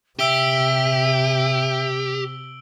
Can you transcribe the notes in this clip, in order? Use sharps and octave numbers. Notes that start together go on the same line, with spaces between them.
C3 G4 E5 E6 D7 G7